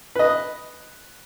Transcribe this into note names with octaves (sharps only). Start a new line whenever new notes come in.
B4 D#5